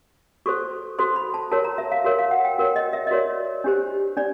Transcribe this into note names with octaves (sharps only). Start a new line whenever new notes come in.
F#4 A4 C5 C#6
F#4 A4 C5 C6
B5
A5
F#4 A#4 C#5 A5
A#5
E5
F5
F#4 A#4 C#5
F5
F#5
G5
F#4 A#4 C#5
D#5
E5
D#5
F#4 A#4 C#5 D5
D4 G4 C5
D4 D5